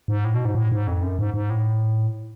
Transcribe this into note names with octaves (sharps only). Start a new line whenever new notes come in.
G#2
A2
B2
G#2
A2
G#2
F2
F#2
G#2
G#2
A2